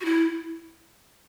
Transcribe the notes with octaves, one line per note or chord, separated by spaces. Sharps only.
F#4
E4